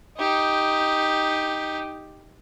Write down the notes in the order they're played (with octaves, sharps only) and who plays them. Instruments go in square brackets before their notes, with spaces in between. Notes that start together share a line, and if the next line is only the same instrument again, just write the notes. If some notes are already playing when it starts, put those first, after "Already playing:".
[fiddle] D#4 G4